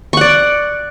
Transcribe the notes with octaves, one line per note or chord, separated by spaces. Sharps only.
D5 F#5 C#6